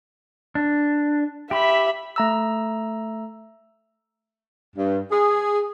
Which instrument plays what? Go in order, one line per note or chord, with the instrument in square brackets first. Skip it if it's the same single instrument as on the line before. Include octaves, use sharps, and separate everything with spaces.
[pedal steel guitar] D4
[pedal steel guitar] G4 [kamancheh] E5 B5
[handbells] A3 A#5 E6
[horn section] G2
G#4